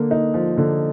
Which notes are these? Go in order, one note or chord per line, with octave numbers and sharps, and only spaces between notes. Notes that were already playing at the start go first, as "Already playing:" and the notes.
Already playing: D3 A#3
D#4
F3
D3